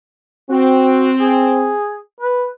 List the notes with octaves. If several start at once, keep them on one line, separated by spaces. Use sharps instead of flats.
C4 F#4
G#4
B4